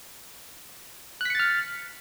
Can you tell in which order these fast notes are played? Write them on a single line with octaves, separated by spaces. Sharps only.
F#6 B6 C#7 A6 F6